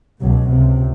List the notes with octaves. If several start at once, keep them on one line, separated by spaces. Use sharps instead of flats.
C#2 B2 F#3
C#2 C3